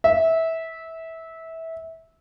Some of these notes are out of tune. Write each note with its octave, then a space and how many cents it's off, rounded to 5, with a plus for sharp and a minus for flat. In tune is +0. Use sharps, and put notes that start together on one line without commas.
E5 -20